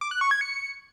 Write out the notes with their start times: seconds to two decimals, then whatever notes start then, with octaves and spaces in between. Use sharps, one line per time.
0.01 D6
0.11 F#6
0.21 C#6
0.31 G#6
0.41 C#7